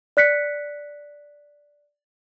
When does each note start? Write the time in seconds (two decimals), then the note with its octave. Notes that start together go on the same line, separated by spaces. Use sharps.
0.17 D5 F#6 B6 C#7